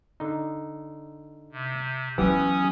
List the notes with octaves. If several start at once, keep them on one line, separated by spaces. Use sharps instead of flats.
D3 D#4
C3
E3 F#3 B3 C#4 F4 G4 D#6